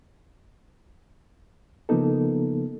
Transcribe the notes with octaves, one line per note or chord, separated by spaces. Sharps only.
C#3 F3 A#3 B3 D#4 A4